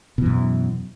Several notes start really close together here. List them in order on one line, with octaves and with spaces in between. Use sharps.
B2 E3 F#2